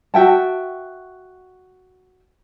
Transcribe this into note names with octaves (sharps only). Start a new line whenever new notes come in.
F#4 E5 G5 A5